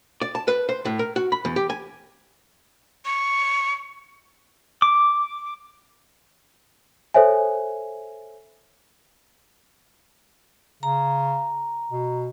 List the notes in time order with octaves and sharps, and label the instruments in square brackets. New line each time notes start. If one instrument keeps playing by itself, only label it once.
[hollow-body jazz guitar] D5
A5
B4
C5
A2
A#4
F#4
B5
E2
G4
G#5
[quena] C#6
[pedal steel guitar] D6
[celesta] A4 C5 C#5 E5 G#5
[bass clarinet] C#3 [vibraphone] A#5
[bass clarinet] B2